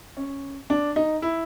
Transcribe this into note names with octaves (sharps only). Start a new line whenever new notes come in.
C#4
D4
D#4
E4